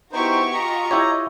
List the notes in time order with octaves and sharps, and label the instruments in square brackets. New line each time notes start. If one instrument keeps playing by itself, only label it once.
[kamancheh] B3 E4 [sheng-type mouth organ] D#4 C5 [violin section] F#4 G4 C#6
[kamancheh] F4 D#5 [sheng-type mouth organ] A#5
[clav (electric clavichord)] E4 G4 C#5